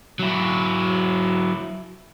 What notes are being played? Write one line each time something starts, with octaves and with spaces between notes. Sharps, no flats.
F#3 E4